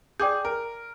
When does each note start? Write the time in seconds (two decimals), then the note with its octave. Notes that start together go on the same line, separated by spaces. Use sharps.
0.20 G#4 D5 G5 D6 G6
0.45 A#4